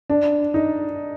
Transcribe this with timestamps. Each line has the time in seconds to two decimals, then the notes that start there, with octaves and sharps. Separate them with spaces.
0.10 D4
0.54 D#4